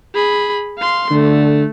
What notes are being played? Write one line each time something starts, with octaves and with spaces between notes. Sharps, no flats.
G#4 B5
F5 C6
D3 A3